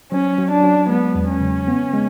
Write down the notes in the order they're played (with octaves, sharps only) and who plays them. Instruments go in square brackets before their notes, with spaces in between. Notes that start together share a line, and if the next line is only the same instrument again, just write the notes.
[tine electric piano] F#3 [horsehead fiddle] C#4
[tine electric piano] F#3
[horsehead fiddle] D4
[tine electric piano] F#3
[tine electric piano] G#3 [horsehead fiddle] B3
[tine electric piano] E2
[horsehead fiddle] C#4
[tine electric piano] C#3
B3
G#3